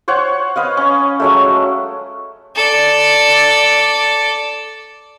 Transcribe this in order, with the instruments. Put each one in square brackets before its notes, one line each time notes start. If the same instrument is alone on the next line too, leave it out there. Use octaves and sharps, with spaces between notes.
[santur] C5 C#5 F#5
B4 D#5 F5
C#4
F#3 G#3 A3
[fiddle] A4 D5